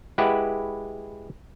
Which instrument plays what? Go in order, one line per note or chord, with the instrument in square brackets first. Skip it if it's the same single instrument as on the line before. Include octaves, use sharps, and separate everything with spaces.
[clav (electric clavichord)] G#3 E4 G4 B4 F#5